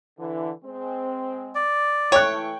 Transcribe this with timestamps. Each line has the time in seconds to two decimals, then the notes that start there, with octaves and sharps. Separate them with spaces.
0.19 D3 E3
0.64 G#3 C4
1.55 D5
2.12 E3 A3 E4 C#5 G5 C#6 F#6